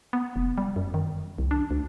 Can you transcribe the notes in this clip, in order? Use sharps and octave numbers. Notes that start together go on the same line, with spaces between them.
B3
F1
G3
F#2
D#3
C2
D4
D2